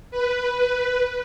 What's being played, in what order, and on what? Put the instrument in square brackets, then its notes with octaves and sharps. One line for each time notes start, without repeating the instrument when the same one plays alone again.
[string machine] B4